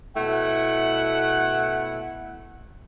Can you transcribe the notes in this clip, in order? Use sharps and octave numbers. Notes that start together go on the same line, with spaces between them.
B2 A3 E4 F#5